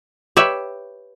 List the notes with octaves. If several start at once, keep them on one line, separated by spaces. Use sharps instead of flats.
G4 B4 C#5 E5